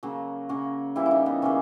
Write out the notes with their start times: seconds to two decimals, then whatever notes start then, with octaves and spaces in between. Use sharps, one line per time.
0.03 C#3 F#3 A#3
0.49 C#3 F#3 A#3 F#4
0.96 C#3 E3 G3 A#3 E4
1.06 E4
1.11 D#4
1.26 B3
1.42 C#3 E3 G3 A#3 C#4